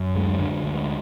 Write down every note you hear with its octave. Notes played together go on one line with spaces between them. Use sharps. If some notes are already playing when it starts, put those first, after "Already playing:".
Already playing: F#2
D2 G#3
D3
D2